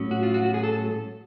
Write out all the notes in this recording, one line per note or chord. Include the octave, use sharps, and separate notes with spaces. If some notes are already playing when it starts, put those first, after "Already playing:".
Already playing: A2 F#3 C#4
F#4
F4
F#4
F#4
G#4
A4